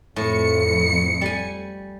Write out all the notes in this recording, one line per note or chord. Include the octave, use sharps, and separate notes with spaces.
F2 A2 C#7
G3 G#5